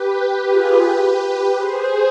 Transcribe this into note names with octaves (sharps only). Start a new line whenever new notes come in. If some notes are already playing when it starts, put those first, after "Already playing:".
Already playing: G4 B4
F4 G#4
G4 B4
G4 B4
G#4 C5